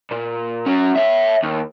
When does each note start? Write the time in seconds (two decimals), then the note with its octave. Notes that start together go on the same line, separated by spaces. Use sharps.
0.11 A#2
0.66 F#3 C#4
0.96 C#5 E5
1.43 D#2